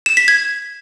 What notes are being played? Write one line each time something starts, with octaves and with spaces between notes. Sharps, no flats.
E7
B6
G#6